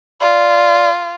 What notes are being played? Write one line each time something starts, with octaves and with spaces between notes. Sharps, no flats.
F4 D5